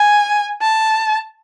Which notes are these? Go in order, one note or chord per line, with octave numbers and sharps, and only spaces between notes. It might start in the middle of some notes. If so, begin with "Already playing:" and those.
Already playing: G#5
A5